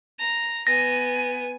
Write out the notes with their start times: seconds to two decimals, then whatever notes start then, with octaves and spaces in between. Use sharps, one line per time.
0.19 A#5
0.67 B3 G#5 A#6